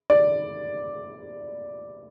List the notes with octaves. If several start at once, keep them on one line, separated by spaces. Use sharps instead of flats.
D5